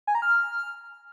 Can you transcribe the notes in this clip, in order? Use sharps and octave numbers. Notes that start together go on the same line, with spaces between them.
G#5
A#5
F6